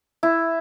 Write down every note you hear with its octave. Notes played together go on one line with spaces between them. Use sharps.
E4